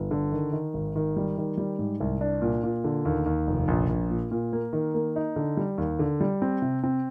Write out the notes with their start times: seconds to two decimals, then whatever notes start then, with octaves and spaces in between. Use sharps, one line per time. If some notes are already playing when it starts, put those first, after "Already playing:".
Already playing: G1
0.11 D3
0.32 D#3
0.53 D#3
0.74 G#1
0.95 D#3
1.17 G3
1.38 D#3
1.58 G3
1.79 G#2
2.00 C2
2.21 D4
2.42 A#2
2.64 A#2
2.84 D3
3.05 D#2
3.26 D#2
3.47 F1
3.68 A#1
3.89 A#1
4.10 A#2
4.31 A#2
4.53 A#3
4.73 D#3
4.94 A#3
5.16 D#4
5.36 D3
5.57 G3
5.78 D#2
5.99 D3
6.21 G3
6.42 C4
6.62 C3
6.83 C4